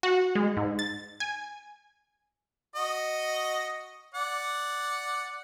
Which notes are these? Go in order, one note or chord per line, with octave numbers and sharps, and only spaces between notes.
F#4
G#3
G#2
A6
G#5
F#4 D#5
D5 F#5